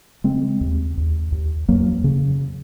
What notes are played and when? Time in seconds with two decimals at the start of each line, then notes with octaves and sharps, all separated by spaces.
0.24 C#3 G#3 C4
0.61 D#2
0.97 D#2
1.32 D#2
1.68 F2 F#3 A#3
2.04 C#3